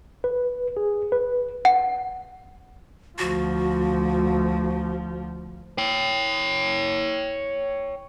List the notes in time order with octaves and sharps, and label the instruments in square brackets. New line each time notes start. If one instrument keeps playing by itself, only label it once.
[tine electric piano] B4
G#4
B4
[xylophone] F#5
[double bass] D2 F3 [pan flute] F#4
[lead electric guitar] C#5 G5